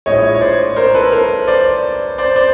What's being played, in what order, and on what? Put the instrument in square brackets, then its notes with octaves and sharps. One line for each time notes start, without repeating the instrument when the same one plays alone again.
[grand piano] A#1 A2 F3 G#3 C#5 D#5
C#5
C5 D5
A#4 C5
A4 B4
A#4 C5
C5 D5
C5 D5
C5 D5